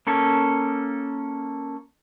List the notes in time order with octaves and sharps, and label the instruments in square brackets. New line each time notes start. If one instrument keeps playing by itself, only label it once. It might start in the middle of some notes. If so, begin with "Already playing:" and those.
[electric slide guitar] A#3 C#4 A4